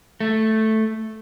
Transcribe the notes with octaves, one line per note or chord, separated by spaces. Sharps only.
A3